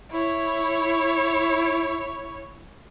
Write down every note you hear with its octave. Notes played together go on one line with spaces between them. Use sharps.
E4 C#5